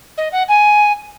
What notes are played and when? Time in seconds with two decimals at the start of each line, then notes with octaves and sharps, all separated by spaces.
0.17 D#5
0.32 F#5
0.48 G#5